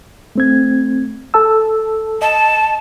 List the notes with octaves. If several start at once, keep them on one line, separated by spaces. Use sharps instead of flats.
A3 C4 G#6
A4 A5 E6
D#5 A5